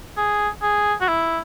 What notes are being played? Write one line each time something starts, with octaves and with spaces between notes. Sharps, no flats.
G#4
G#4
F#4
E4